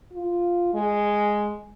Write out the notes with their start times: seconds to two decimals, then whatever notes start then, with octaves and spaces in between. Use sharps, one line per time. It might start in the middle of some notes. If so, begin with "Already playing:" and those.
0.12 F4
0.74 G#3